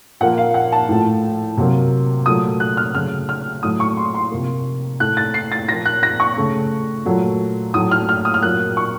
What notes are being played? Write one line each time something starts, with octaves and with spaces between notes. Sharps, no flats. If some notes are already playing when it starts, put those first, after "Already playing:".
A#2 F3 A#3 F#5
F5
F#5
A5
A2 F3 A3
C3 F#3 A#3
A#2 F#3 A3 D#6
F#6
F6
C#3 F#3 A3 F6
F6
A2 F#3 A3 D#6
C#6
C6
C6
C3 F3 A#3
A2 A3 F#6
A6
C7
A6
A#2 F3 A#3 A#6
F#6
A#6
C#6
C#3 A3
A#2 F#3 A3
A2 F#3 A3 D#6
F6
F6
D#6
F6
A#2 F#3 A#3 F#6
C#6